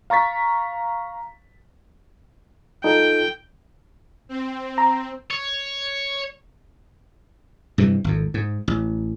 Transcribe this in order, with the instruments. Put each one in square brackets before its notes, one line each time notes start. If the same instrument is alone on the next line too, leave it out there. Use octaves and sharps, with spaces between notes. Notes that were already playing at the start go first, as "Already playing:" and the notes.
[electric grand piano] F5 A#5 C#6 A6 B6
[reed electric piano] D#4 F4 A4 [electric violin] G5
[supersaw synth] C4
[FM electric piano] A#5
[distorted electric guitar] C#5
[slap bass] G2 C3 E3
G#1 F2
G#2
A1